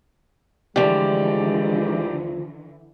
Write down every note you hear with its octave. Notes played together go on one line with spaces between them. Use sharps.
D2 D3 E3 F3 G#3 G4 D5